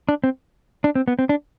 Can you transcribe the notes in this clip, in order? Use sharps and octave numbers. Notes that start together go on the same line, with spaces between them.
D4
C4
D4
C4
B3
C4
D4